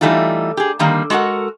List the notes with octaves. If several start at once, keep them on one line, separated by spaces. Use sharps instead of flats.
E3 G3 A3 D#4 F4
G4 G#4
D3 D#3 G3 A#3
G#3 F#4 A4 A#4 F#5